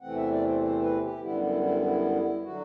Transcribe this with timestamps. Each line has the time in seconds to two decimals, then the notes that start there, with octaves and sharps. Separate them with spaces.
0.01 E2 C3 E3 A3 C4 F#5
0.16 E5
0.31 D5
0.46 C5
0.61 C5
0.82 B4
1.02 G4
1.22 F#2 D3 G3 B3 E4
1.42 E4
1.62 E4
1.83 E4
2.43 D3 F#3 F#4